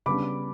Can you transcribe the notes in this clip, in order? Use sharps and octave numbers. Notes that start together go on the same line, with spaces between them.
C#3 G3 B3 D4 B5 D6